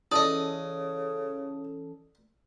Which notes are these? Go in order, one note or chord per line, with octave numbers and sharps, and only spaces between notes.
C#3 E3 C#4 A4 D5 D#5 D#6